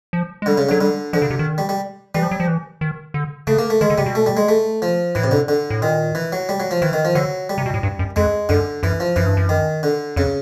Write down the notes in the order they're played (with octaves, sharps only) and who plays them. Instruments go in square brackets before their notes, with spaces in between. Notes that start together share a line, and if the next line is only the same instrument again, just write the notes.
[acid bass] F3
G#3
[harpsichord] D3 [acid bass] G3
[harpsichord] C#3
[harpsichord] D3 [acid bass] F#3
[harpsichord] D3 [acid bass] G3
[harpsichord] D3 [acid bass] F3
[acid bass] C#3
C3
D#3
[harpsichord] G3
G3
[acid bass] E3 [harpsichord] G3
[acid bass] F3
F#3
F3
E3
D#3
D3
[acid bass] C#3 [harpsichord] A3
[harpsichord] A#3
A3
[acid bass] D#3 [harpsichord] G#3
[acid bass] D3
[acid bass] C3 [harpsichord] G3
[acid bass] B2
[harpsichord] A3
G3
G#3
A3
F3
[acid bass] A2 [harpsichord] E3
[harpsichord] C3
D3
D3
[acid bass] A2
[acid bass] A#2 [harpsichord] D#3
[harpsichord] E3
F#3
G3
F#3
F3
[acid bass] D#3 [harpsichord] E3
[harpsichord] D#3
F3
[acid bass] D3 [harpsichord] F#3
[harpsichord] G3
[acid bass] C3
B2
A2
G2
F#2
[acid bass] F2 [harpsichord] G#3
[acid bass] F#2 [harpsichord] D3
[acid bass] F#2 [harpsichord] E3
[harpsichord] F3
[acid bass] F#2 [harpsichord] E3
[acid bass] G2
F#2
[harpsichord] D#3
D3
[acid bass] F2 [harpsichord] C#3